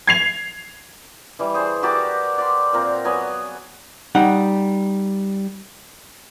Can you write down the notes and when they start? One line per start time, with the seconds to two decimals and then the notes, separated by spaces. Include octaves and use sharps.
0.07 G#6 C7 F7
1.39 E3 G3
1.54 G#4 C5
1.83 F#4 G4 A#4 D5
2.38 D5 C6
2.73 A#2 C4 A#4
3.05 F#3 B3 G#5
4.15 G3 D#4 F#5